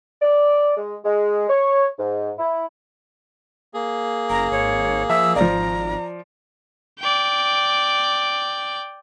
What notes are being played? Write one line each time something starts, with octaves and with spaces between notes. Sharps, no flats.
D5
G#3
G#3
C#5
G#2
E4
A#3 G#4
F#1 A#5
G#1 C#5
F3 E5 E6
G#1 F3 D5 A#5
D5 G5